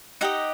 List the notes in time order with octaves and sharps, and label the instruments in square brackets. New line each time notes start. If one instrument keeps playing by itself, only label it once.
[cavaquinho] D#4 G4 D#5 F#5